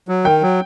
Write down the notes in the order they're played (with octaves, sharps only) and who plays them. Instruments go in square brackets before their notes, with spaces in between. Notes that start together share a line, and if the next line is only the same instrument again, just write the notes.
[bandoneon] F#3
[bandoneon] D#3 [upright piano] G5
[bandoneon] F#3